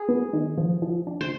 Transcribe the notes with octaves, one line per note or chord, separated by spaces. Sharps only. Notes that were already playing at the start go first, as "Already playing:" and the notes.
Already playing: G#4
B3
D#3
F3
F3
D4
C5